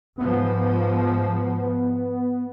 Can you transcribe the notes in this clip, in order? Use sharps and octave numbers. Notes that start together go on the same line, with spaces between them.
G#2 F3 B3